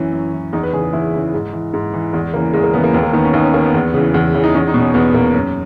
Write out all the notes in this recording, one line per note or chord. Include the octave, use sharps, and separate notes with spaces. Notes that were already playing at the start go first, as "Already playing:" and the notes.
Already playing: F#2 E3 C#4
F#2
E3
E2 D#4
B4
C#3 E3 G#4
G#4
E2 E4
C#3 E3
G#2
E3
G#2
E3
E2 G#3
C#3 E3 A#3
E2 G#3
A#3
C#3 E3 B3
A#3
D#2 B3
A#3
D#3 B3
C#4
D#2 D#4
C#4
D#3 A#3
B3
E2
C#3 E3
E2
C#3 E3
D#4
E2 C#4
D#4
B2
C#4
E2 B3
B2 A#3
F#2